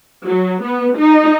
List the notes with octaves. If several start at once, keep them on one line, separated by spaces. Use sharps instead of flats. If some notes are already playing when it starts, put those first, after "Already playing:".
F#3
B3
D#4